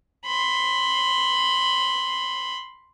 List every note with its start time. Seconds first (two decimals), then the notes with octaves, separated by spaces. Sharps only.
0.26 B5 C6